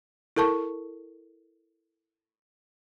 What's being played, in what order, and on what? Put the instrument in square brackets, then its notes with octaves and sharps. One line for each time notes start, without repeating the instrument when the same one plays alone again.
[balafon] E4 A4 A#4 A5 C#6